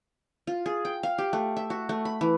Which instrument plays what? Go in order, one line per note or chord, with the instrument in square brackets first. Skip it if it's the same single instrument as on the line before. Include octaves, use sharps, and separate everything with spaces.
[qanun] F4
G#4
G5
F5
G4
A3
E5
F#4
A3
B5
E3